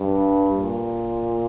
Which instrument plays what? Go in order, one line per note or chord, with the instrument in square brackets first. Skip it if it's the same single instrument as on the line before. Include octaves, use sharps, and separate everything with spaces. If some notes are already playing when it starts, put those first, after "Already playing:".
Already playing: [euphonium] G2
A#2